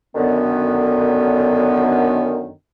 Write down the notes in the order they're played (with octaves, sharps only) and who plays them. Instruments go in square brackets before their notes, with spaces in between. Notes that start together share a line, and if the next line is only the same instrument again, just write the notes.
[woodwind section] F#2 D3 D#3 B3